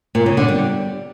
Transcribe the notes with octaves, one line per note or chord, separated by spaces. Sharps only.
A#2
C#3
D3
G3